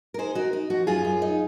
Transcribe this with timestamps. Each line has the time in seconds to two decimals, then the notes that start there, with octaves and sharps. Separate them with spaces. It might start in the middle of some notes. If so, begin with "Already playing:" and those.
0.14 A#4
0.18 D#4 G#4 C5
0.35 D#4 F#4 A#4
0.53 D#4
0.70 F3 F#4
0.87 F#2 F4 G#4
1.05 F#2
1.22 D#4